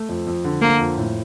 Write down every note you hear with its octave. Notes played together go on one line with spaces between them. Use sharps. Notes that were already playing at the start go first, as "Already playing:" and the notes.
Already playing: A3
F2
F2
D3
D3 A#3
F2
A2